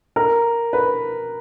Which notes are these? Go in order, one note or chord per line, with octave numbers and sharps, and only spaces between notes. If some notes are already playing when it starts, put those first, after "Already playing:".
A#4
B4